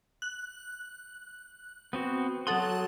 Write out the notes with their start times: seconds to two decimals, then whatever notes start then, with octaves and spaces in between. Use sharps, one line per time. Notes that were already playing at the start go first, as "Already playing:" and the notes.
0.22 F#6
1.93 B3 C4 F#4
2.47 F#3 A4 F#5 C6 D#6